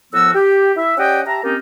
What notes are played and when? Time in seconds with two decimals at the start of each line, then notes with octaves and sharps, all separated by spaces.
0.13 A2 F3 B3 F#4 A#4 E6
0.35 G4
0.77 E4 E5
0.97 C#4 G4 D5 D#5 F#5 G5
1.26 G4 E5 A5 A#5
1.43 A#3 C4 C#4 D#4 F4 G4